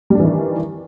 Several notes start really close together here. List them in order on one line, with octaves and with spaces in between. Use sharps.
G3 D4 E3 D#3